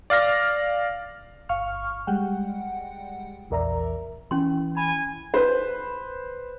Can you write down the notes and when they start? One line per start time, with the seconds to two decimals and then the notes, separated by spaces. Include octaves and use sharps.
0.10 D5 F5 F6 A#6
1.49 G1 F5 C#6 F6
2.07 G3 G#3 F#5 G5
3.50 A#1 E2 A#4 D5 E5 A#5
4.31 E3 C#4 C6
4.77 G#5 B5
5.34 B4 C5